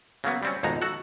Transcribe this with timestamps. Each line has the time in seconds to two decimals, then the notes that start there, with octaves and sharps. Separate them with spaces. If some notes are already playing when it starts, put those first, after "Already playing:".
0.24 C#3 F#3 A#3 B3
0.43 G3 C4 C#4
0.63 G#1 F2 B2 G#3 D#4 A#5
0.82 F#4 A4 F#5